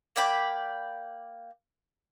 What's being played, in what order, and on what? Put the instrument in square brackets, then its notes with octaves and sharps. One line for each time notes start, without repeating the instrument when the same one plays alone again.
[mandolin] A#3 D5 G5 B5